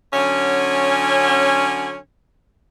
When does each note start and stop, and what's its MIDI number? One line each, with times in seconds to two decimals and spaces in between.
0.14 1.97 50
0.14 1.97 54
0.14 1.97 61